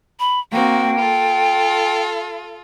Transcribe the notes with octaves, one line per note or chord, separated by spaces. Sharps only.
B5
A#3 C4 F#4 G5
F4 A4